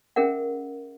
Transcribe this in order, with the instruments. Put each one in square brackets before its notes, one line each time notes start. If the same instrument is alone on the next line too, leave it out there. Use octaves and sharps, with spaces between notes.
[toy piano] C#4 G#4 A#4 E5 F#5